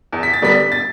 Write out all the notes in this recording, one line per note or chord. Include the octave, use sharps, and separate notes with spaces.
E2
B6
A6
D3 G3 B3 D4 B6
A6